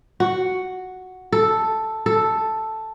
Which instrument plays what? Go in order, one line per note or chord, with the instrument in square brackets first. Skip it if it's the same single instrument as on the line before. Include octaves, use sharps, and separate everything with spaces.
[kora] F#4
A4
A4